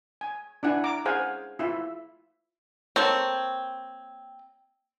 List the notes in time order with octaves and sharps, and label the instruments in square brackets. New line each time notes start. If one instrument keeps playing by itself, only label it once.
[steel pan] G#5
D4 E4 F#5 G#5
A#5 D6
G#4 C5 F5 F#5 G#5
E4 F4 E5
[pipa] A#3 A4 C#5 [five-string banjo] C4